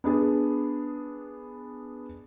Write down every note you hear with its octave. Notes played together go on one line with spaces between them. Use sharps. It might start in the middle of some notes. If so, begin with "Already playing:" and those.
B3 D4 G#4